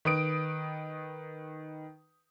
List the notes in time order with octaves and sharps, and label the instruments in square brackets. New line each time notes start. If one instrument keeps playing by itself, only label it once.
[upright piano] D#3 B4 D#6 D7